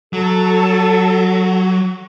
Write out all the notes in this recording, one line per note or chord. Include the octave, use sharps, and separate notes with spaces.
F#3 A4